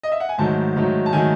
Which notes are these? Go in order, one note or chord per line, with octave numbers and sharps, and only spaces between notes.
D#5
E5
F#5
G#5
G#2 D#3 F#3 A3 A5
G#2 D#3 F#3 A3
A5
D#3 F#3 A3 G#5